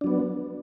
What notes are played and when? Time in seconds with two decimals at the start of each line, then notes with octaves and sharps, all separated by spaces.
0.01 D4
0.04 F#3
0.07 B3